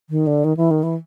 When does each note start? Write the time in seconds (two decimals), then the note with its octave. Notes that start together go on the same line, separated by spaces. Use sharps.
0.10 D#3
0.27 D3
0.44 D#3
0.57 E3
0.71 D#3
0.83 E3